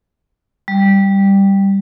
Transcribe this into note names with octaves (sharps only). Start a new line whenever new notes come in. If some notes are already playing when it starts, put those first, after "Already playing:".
G3